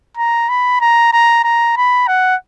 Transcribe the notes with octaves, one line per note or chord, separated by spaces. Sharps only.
A#5
B5
A#5
A#5
A#5
B5
F#5